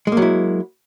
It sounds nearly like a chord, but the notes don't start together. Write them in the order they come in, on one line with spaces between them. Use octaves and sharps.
G#3 A#3 F#3 E4